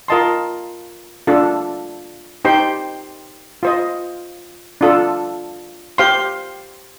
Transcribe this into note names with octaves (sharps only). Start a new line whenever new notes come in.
F4 A#4 D#5 A5 C6
D4 F4 A4
D#4 G4 C5 G5 C6
F4 C5 D#5
D4 F4 A4
G4 C5 F5 C6